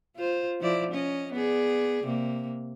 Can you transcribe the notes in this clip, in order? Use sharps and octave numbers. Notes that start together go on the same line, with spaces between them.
F4 C5
F3 E4 D5
C#4 D#5
B3 G#4 D5
C3 A#3